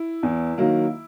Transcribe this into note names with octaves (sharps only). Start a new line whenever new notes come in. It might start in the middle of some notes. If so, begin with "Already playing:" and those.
Already playing: E4
E2
D#3 F#3 A#3